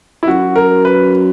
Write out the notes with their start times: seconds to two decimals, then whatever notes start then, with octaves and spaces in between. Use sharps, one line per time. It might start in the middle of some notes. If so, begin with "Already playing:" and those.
0.23 E4
0.27 F#2 F#4
0.56 A#4
0.85 B4